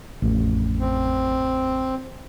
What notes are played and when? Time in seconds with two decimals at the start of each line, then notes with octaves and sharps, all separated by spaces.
0.22 A1 F2
0.79 C4